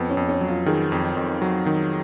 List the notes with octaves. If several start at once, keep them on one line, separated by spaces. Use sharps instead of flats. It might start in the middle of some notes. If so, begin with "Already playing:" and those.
Already playing: F2 B3
C#4
F2
C#4
F#3
F4
D#3 G#4
F2
F2
F#3
D#3